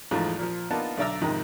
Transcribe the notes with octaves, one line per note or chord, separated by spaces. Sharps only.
A#1 E2 G#2 F3 A3
A#2 F3
A#3 B3 D4 D#4 F4 A5
B1 D3 D5 E5 A#5 E6
F2 G#2 C3 D#3